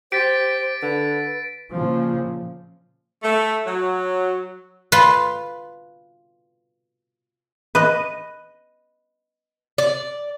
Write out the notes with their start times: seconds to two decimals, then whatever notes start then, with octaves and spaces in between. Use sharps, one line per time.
0.12 G4 C5 A6 B6 D7
0.82 D3 B4
1.71 A#2 C#3 F3
3.22 A3
3.65 F#3
4.92 F4 B4
7.75 B4 D#5
9.78 D5